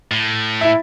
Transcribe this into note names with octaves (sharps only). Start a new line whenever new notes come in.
A2
E4 E5